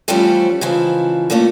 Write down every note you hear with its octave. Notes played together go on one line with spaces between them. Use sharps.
E3 F3 G3 A3 C4 C#4
G#2 C#3 E3 F3
G2 A3 A#3 C#4 F4